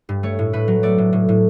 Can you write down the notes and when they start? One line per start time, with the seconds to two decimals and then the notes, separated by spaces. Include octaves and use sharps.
0.09 G2
0.23 A3 C#5
0.39 A2
0.53 A2 B4
0.68 F#3
0.83 A3 D5
0.98 A2
1.13 A2
1.29 A2